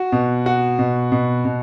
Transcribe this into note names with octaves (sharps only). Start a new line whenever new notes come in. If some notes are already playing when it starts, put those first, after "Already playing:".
Already playing: F#4
B2
F#4
B2
B2
B2